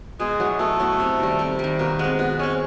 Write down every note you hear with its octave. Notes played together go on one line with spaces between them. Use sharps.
B2 G#3 G#4
F#3 B3 E4
B2 A3 A4
F#3 B3 E4
C3
D#3 G3
C3
D#3 G3
B2 A#3 A#4
G#3 B3 C4 B4
B2 B3 B4
G#3 C4 C#4 C#5